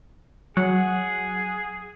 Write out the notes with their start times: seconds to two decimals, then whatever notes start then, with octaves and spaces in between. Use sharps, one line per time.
0.57 F#3 G#4 F#5